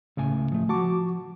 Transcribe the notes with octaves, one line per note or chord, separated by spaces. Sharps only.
C#2 A2 C#3 G#5
F3 A3
F3 F#4 A5 C#6 D6